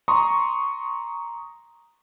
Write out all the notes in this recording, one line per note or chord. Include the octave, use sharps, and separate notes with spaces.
A#5 C6 C#6 D#6